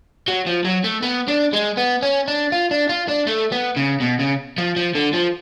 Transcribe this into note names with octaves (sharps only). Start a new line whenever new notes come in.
F#3
F3
F#3
A3
B3
D4
G#3
B3
C#4
D4
F4
D4
F4
D4
A3
B3
C#3
B2
C#3
F3
F3
D3
F3